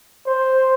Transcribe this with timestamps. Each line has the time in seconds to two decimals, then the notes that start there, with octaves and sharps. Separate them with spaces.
0.26 C5